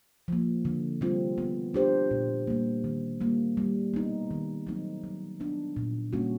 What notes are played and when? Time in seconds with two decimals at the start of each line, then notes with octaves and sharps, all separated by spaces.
0.28 F3 A#3
0.65 D3
1.01 G3 C4 F4
1.38 B3
1.74 D4 G4 C5
2.11 A#2
2.47 G3 A#3
2.84 D#3
3.21 G3 A#3
3.57 G3
3.94 B3 D#4
4.31 D#3
4.67 F#3 A3 C4 D#4
5.04 F#3
5.40 B3 D4
5.77 A#2
6.13 G3 A#3 C#4 F#4